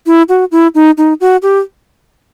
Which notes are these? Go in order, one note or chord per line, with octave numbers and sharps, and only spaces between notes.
E4
F#4
E4
D#4
D#4
F#4
G4